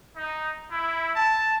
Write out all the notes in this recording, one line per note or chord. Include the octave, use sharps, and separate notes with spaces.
D#4
E4
A5